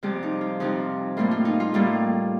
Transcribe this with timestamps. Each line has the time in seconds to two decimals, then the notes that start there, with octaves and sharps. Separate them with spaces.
0.03 F2 C3 G3 G4
0.23 D#4
0.41 F4
0.60 F2 C3 G3 D#4
1.17 A2 G3 A#3 F4
1.31 F4
1.45 D#4
1.60 F4
1.74 A2 G3 A#3